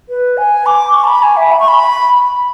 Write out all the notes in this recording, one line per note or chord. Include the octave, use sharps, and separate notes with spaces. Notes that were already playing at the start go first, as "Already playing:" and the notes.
B4
G#5
D6
C#6
A5
B5
G#5
E5
B5
C#6
B5